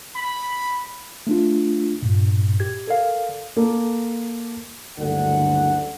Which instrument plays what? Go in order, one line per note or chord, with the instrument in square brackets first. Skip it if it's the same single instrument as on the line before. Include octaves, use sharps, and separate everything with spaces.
[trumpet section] B5
[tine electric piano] A3 D4 F4
G2 A#2
G4 G#6
A4 A#4 D5 F5
[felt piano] A#3 A4
[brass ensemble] F#1 D2 G2 D3 F#5